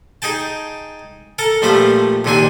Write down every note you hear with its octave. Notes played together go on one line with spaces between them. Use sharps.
D#4 G#4 G5 A5
A4 A#4 A5 A#5
A#1 F3 G3 A3 C5 B5
A#1 D#2 A#2 C4 D4 G#5